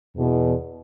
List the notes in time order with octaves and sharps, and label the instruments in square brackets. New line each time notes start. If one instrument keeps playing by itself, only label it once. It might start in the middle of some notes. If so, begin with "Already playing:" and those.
[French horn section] E2 B2